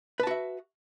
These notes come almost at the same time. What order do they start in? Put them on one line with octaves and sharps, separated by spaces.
B4 A5 F#4 E5